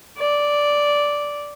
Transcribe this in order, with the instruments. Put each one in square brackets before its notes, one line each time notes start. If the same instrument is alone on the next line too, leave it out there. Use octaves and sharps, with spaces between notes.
[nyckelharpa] D5